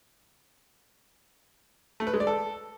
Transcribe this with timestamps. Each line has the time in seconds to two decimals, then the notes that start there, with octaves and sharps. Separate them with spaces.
2.00 A3
2.07 B4
2.13 G#3
2.20 D5
2.27 A4